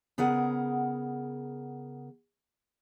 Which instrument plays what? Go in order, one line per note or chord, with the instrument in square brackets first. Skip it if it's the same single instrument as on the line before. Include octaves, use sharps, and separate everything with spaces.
[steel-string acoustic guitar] C#3 B3 G#4 A#4 F#5